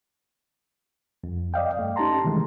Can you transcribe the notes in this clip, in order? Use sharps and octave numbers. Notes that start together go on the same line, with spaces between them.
F2
D5 D#5 F5 G5
G2 A3
C#4 D#4 G4 A5 A#5 C6
C3 D#3 E3 G#3 A3